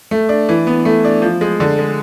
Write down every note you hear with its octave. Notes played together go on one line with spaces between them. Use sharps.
A3
D4
E3
B3
A3
D4
F3
G#3
D3
G#3